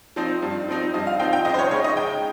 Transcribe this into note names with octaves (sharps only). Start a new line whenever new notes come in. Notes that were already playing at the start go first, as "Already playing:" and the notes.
F3 C4 D#4
G2
F3 C4 D#4
G2 D#5
F5
F3 C4 D#4 G5
G5
C#2 D#5
C5
C#5
C#3 G#3 D#4 C#5
D#5
C#2 G5